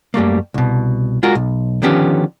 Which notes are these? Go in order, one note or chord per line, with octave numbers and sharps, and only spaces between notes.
F#2 G3 A3 A#3
C2 B2
G#3 F4 F#4 A#4
B1
D3 D#3 F3 B3 C#4 G4